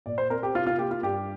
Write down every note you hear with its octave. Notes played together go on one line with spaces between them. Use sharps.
A#2 D5
C5
C4 A#4
G4
C3 F4
F4
A#3 G4
F4
G2 G4